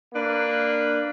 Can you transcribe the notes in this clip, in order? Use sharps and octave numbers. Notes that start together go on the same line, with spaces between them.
A#3 D4 B4